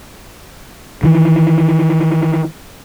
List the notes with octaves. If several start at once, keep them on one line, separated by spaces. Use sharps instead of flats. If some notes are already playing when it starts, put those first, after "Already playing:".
D#3 E3